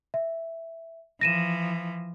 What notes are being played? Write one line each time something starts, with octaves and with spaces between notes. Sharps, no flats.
E5
E3 F3 A#6 D#7 E7